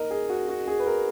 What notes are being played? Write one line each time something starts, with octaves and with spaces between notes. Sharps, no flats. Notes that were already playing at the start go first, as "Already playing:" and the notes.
Already playing: D#3 A#3 A#4 D#5
G#4
F#4
F#4
G#4
B4
A#4